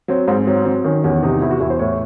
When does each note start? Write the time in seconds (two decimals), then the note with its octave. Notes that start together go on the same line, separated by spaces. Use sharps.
0.08 F#3 C4
0.28 G#2 C4
0.47 F#3 C4
0.65 F#3 C4
0.84 D#3 C#4
1.04 E2 C#4
1.23 C3 D#4
1.41 E2 E4
1.51 F#4
1.60 E2 E4
1.70 C5
1.79 A2 C#5